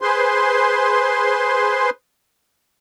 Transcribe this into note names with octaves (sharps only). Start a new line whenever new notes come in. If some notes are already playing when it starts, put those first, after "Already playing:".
G#4 B4 C5 C6